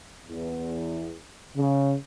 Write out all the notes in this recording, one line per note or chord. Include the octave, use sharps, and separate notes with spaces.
E2
C#3